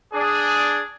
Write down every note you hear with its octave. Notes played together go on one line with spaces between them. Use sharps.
D4 G#4